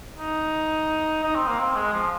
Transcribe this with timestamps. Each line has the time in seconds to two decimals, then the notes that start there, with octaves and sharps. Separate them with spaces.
0.17 D#4
1.23 D#4
1.35 C4
1.47 A#3
1.60 C4
1.76 G#3
1.93 F3